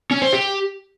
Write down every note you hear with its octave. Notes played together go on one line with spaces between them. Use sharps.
C#4
C5
G4